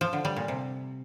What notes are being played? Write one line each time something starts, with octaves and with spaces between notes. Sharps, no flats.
F3
D3
G3
A#2
C3